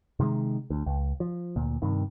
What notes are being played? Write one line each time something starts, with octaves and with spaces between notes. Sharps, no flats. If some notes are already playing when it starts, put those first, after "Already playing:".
C3 D#3 F#3 G#3
D2
C#2
F3
D2 A#2
G2 C3 D#3